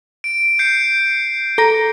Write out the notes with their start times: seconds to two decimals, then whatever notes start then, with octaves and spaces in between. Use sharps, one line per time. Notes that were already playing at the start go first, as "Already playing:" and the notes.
0.24 D7
0.59 G6 C7 C#7
1.58 A4 A#5 A#6